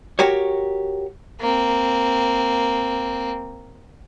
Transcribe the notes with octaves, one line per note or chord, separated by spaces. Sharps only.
F#4 G4 A#4 C#5
A#3 C4